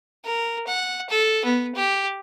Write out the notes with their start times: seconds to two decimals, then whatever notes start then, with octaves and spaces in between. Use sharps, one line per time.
0.25 A#4
0.67 F#5
1.10 A4
1.45 B3
1.75 G4